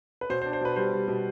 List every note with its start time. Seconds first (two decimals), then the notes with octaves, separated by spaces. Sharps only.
0.21 B4
0.30 B2 C5
0.42 C5
0.46 D4
0.53 C5
0.61 B2 B4
0.76 G3 C5
0.93 G3
1.08 B2